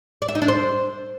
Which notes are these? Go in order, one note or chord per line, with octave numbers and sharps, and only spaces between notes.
D5
E5
D#4
D4
C5